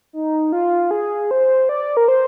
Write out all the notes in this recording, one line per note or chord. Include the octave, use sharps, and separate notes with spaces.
D#4
F4
G#4
C5
D5
A#4
C5